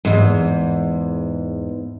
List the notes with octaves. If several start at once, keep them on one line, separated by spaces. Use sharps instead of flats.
E2 G#2